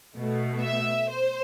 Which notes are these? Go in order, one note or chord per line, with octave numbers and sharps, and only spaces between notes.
B2 A3
E5
C5